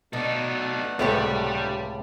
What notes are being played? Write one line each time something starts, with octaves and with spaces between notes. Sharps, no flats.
B2 A3 D4 D#4 A4 F#5
C#2 A2 C3 G3 G4 A4 B4 C#5